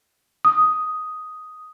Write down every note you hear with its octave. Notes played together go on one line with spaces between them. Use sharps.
D#6